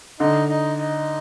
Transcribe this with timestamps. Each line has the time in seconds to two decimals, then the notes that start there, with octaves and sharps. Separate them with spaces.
0.20 D3 D#4
0.48 D#4
0.78 D#4